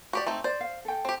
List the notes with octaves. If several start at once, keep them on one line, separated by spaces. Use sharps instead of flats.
F#4 G4 D5
A3 C4 D#4
C5 D5
F5
A4 G5
C4 G4